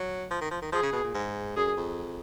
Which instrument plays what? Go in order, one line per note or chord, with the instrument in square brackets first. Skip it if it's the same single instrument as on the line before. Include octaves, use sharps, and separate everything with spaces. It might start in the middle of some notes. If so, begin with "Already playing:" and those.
Already playing: [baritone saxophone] F#3
F3
D#3
F3
D#3
[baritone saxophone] F3 [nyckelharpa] G#4
[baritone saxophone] C#3
B2
A#2
G#2
[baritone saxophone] F#2 [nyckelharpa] G#4
[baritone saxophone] F2